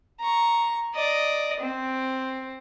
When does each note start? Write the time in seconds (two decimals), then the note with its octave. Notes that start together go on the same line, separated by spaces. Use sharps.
0.20 A#5 C#6
0.95 D5 D#5
1.60 C4